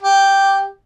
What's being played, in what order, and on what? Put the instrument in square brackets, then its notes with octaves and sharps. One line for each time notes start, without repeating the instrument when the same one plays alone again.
[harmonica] G4